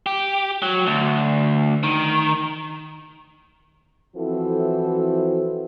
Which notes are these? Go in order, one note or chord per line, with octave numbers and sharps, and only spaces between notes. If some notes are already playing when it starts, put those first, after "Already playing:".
G4
F#3
D2
D#3
E3 F3 C4 E4 F#4 A4